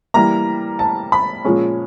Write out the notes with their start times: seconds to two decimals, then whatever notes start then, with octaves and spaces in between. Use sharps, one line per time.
0.14 E3 G3 A#3 A#5
0.79 A5
1.12 B5
1.45 A#2 F3 G#3 C#4